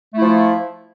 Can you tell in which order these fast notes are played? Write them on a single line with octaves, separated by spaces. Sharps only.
A3 E4 F3